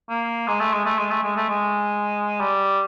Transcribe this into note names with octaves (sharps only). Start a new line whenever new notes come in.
A#3
G#3
A3
G#3
A3
G#3
A3
G#3
A3
G#3
G3